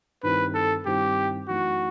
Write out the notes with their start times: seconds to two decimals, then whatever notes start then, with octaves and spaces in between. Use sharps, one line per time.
0.23 G2 D#3 G3 C4 E4 B4
0.54 A4
0.86 G2 D#3 G3 C4 E4 G4
1.48 F#2 E3 A3 D#4 F#4